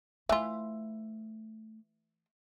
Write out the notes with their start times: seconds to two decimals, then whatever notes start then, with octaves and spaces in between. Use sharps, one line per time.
0.29 E3 A3 F4 E5